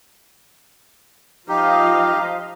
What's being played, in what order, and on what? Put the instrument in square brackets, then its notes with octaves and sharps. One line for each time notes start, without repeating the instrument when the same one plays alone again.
[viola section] F3 D#5 F5 [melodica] D#4 G4